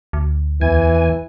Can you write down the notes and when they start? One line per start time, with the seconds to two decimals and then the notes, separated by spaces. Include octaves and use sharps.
0.13 D2
0.61 E2 E3 G#5